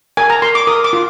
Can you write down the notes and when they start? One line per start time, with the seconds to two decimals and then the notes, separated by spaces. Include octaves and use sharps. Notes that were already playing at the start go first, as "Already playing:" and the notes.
0.17 A#4 G#5
0.30 A#5
0.42 A#4 C6
0.55 D6
0.67 A#4 D#6
0.84 D6
0.93 F4